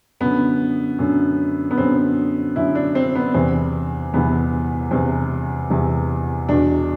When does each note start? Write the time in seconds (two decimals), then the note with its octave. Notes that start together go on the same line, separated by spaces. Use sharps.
0.20 F#2 D3 B3
0.99 F#2 D3
1.71 B3
1.78 F#2 D3 C4
2.56 F#2 D3 E4
2.75 D4
2.95 C4
3.15 B3
3.34 E2 C3 E3 C4
4.14 E2 C3 E3 B3
4.91 E2 C3 E3 C4
5.70 E2 C3 E3
6.49 E2 B2 D4